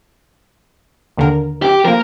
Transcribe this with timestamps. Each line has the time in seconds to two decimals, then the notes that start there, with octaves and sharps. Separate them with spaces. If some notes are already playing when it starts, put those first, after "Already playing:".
1.17 D#2 D3 A#4
1.62 G4
1.85 F3 A#3 A#4